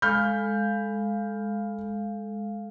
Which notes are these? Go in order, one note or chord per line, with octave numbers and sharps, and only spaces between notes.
G#3 A4 F5 B5 F6 G6